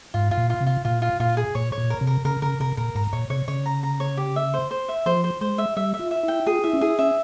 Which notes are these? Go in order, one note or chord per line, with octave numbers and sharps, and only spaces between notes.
G#2 F4
F4
A#2
F4
C3
F4
A#2 F4
F4
A#2 F4
G#4
A#2 C#5
C#5
A#2
A#4
C3
A#4
C#3 A#4
C#3 A#4
C3 A#4
A#2 A#4
G#2 A#5
A#2 C#5
C3 C#5
C#3 C#5
A#5
A#5
C#5
G4
E5
C5
C5
E5
F3 C5
C5
G#3 C5
E5
G3 E5
E5
F4
E5
E4 G5
F4 G#4
E4 E5
C#4
E4 G#4
C#4 E5